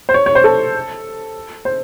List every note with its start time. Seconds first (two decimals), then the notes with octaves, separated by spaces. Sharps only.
0.09 C5
0.14 C#5
0.26 C#5
0.35 C5
0.44 A4
1.65 C5